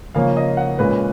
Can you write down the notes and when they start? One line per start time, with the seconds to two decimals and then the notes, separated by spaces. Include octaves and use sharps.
0.15 C#3 F3 A#3 C#4 F5
0.37 D#5
0.57 F#5
0.79 A#2 G#3 C#4 B4